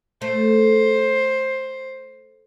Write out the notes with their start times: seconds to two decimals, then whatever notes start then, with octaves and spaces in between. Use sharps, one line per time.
0.22 A3 C5